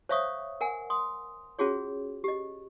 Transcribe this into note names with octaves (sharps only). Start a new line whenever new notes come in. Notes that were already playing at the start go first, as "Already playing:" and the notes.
C5 C#5 E5 F5 C#6 D#6
A#4 F#5 G#5
C6 D#6
C#4 F4 F#4 G#4 C#5
G4 D#5